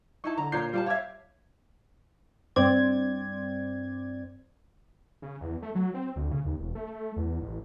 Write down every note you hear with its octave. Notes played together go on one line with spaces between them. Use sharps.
D#4 E4 A5 C#6
D3 A#5
A#2 D4 C#5 A#5 G6 C7
G3 F4 D5 A5
C#5 E5 F5 D6 G#6
G2 C4 C5 D5 G#6
C#3
E2
A3
F#3
C4
D2
C#3
D#2
E1
A3
E2
A1